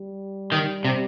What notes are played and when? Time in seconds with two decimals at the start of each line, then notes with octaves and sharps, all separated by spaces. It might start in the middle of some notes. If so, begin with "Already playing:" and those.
Already playing: G3
0.52 D#3
0.85 C3